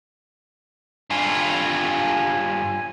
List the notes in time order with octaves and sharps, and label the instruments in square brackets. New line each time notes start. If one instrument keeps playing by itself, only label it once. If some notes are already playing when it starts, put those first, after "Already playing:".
[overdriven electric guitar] G2 F4 [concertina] G#5